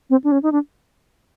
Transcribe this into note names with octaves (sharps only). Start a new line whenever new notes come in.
C4
D4
C#4
D#4
D4